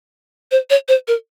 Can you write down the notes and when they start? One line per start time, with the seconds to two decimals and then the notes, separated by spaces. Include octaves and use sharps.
0.51 C5
0.70 C#5
0.88 C5
1.08 A#4